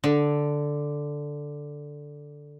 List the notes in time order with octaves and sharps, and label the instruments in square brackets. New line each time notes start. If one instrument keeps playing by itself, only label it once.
[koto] D3